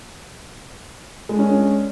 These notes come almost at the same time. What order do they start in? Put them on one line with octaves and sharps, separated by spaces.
G#3 D4 C#4